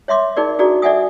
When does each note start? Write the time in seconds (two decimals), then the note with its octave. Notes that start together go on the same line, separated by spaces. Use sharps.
0.08 C#5 E5 C6 D6
0.37 D#4 G#4 A#4 D5
0.59 D4 F#4 G#4 A4 D5 A#5
0.82 A4 D5 E5 F#5 G#5 D#6